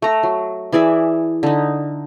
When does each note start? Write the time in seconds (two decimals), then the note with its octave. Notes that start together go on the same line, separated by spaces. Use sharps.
0.02 A3 A#5
0.23 F#3
0.72 E3 G#4 D5 E5
1.43 D3 D#4